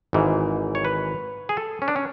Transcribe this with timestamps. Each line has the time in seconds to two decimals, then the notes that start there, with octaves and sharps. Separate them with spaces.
0.13 G#1 G#2 E3
0.75 C#5
0.85 B4
1.49 G#4
1.57 A4
1.82 C#4
1.88 D4
1.96 C#4